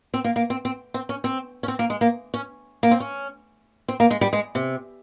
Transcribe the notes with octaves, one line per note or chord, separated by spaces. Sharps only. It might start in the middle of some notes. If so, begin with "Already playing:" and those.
C4
A#3
A#3
C4
C4
C4
C#4
C4
C#4
C4
A#3
G#3
A#3
C#4
A#3
C4
C#4
C4
A#3
G#3
G3
G#3
C3